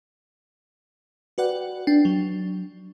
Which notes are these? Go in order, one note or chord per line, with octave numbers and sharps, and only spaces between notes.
F#4 B4 D5 F#5 G5
D4 G5 C7
F#3